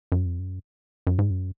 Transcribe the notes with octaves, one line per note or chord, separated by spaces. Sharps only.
F#2
F2
F#2
F#2
G#2
F#2